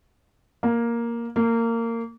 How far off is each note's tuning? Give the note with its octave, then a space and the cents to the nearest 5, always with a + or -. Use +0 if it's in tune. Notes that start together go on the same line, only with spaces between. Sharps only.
A#3 +5
A#3 -20